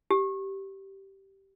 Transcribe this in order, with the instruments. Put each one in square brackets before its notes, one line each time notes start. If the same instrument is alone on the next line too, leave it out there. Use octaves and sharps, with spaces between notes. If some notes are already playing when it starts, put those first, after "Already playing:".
[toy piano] G4